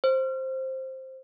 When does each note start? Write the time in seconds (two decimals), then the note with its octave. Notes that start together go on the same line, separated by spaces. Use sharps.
0.04 C5